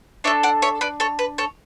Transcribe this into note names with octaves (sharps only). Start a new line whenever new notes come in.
D4 A4 C#5 E5
D5 F#5
C#5 E5
B4 D5
A4 C#5
B4
A4 C#5